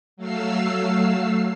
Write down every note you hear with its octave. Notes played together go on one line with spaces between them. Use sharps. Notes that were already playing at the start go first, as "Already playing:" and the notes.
F#3 A3 F5 E6 C7